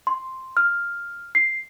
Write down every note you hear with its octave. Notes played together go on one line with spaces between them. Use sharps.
C6
F6
C7